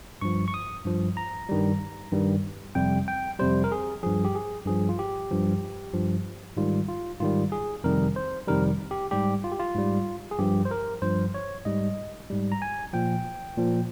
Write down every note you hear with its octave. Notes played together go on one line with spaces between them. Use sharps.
G2 F3 C#6
C#6
D#6
G2 F3
A#5
G2 D#3 G3
G2 D#3 G3
F2 C3 G3 G5
G5
F2 C3 G3 C5
A#4
G#4
G2 F3 G#4
G4
G#4
G2 F3 G#4
F4
G4
G2 F3
G2 F3
G#2 D#3 G3 F4
F4
G#2 D#3 G3 F4
G#4
F2 C3 D#3 G3 A#4
C5
F2 C3 D#3 G3 A#4
G4
G#2 G3 G4
F4
G4
F4
G#2 G3
G#4
G2 F3 G4
C5
A#4
G2 F3 C5
C#5
G#2 G3 D#5
G#2 G3
A#5
G#5
A#2 F3 G5
A#2 F3